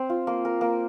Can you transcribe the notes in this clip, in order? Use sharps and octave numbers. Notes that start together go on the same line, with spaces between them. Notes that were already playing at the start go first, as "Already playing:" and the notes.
Already playing: C4 C5
F4
A#3
A#4
A#3